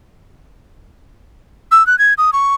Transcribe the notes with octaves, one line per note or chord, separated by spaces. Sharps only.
E6
F#6
G#6
D#6
C#6